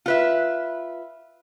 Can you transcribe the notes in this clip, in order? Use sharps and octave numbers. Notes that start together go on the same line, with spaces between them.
F4 B4 E5